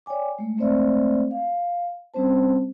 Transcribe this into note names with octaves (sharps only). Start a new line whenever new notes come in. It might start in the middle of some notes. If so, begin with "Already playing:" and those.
C#5 D5 G5 G#5 D6
G#3 A3
G#3 A3 C4 C5 D5 E5
F5
G3 C4 C#4 C5 A5